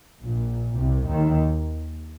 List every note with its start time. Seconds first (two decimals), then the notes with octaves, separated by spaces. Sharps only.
0.21 A#1 A#2
0.78 C2 C3
1.07 D#2 D#3